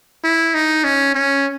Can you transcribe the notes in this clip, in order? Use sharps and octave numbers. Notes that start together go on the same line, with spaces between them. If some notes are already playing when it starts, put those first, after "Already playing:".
E4
D#4
C#4
C#4